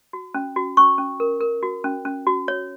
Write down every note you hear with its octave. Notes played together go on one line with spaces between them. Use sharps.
F#4
C#4
F#4
C#4 C#6
C#4
A#4
A#4
F#4
C#4
C#4
F#4
C#5